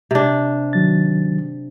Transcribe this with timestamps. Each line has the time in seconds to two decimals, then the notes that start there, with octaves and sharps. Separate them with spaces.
0.11 C3 D4
0.73 D#3 F#3 A6